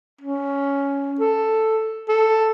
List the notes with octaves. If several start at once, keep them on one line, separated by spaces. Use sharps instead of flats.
C#4
A4
A4